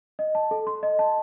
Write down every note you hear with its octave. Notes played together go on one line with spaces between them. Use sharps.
D#5
A5
A4
C6
D#5
A5